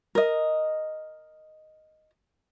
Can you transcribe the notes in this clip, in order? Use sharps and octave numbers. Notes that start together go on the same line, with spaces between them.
A#4 D#5